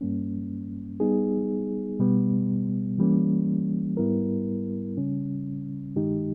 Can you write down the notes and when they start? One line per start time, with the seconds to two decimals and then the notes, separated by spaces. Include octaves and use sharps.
0.01 G2 G3 A#3 C#4
1.00 G3 B3 D#4 G#4
1.99 B2 G3 B3
2.98 E3 G3 A#3 C#4
3.97 G#2 G3 B3 E4 A#4
4.97 C#3 G3 C#4
5.95 G2 D#3 G#3 D#4 G4